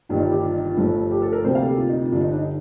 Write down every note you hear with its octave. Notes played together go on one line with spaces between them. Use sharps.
G1 G2 D#3 A#3 F4
D#4
F4
G4
F4
D#4
F4
G1 G2 F3 A3
G4
A4
A#4
D2 C3 G3 A#3 C5
F5
A4
G4
F4
D#4
F4
G1 G2 D3 F4
D#4
D4
D#4